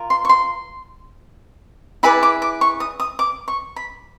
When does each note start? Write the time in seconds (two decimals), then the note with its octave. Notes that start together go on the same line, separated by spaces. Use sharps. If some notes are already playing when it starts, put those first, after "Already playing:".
Already playing: F4 A#4
0.10 C6
0.25 C#6
0.29 C6
2.03 E4 G#4 B4 D5 B5
2.23 D6
2.42 D6
2.61 C#6
2.80 D#6
3.00 D#6
3.19 D6
3.48 C#6
3.76 B5